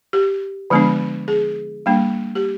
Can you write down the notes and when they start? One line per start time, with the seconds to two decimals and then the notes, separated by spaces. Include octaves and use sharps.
0.13 G4
0.70 D3 F3 G#3 B3 D4
1.28 G#4
1.86 G3 A#3 D4
2.35 G4